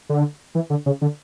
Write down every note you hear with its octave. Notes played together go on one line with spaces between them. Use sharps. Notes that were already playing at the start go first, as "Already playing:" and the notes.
D3
E3
D3
C#3
D3